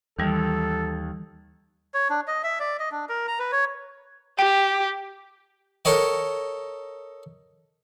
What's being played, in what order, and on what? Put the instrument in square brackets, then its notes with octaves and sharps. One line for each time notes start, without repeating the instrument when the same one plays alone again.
[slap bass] D#2 [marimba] D#3 E3 G3 [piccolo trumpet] A4
[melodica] C#5
D4
D#5
E5
D5
D#5
D4
A#4
A#5
B4
C#5
[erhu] G4 [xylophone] G5
[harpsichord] A4 A#4 C#5 D#5 G5